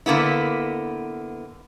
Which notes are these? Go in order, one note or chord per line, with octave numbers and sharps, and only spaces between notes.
D3 A#3 B3 E4